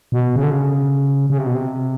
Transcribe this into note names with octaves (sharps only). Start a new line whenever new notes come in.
B2
C#3
D3
C#3
C#3
C3
B2
C3